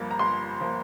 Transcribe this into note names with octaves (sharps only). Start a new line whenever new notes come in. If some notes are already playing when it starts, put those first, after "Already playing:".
Already playing: G1 G2 F3 A#3
A#5
G1 C6
F3 A#3